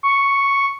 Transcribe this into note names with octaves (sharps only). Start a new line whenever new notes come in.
C#6